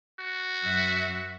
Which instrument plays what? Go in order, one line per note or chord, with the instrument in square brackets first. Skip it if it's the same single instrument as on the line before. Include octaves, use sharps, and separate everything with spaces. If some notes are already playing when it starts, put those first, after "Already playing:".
[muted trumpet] F#4
[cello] F#2 E5